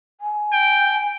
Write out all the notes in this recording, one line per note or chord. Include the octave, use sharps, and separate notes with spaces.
G#5
G5